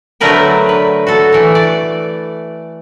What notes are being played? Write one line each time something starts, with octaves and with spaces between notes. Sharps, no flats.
D3 F#3 A3 A#4 B4 G5
B4
F#4 A4
E3 A3
D5